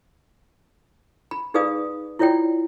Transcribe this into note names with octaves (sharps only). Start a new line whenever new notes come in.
B5
D#4 G#4 B4 D5 F5 D#6
E4 F4 C#5 D5 G5